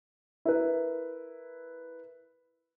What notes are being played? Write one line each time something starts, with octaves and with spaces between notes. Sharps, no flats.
E4 A#4 B4